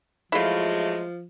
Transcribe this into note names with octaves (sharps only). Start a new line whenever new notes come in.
F3 F#3 G#3 A3 E4 F4